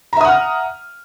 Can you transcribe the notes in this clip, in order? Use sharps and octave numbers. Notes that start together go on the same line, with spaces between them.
E5 F#5 A#5 D#6 F6